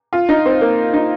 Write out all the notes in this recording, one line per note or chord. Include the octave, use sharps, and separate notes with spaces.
F4
D#4
C4
A#3
D#4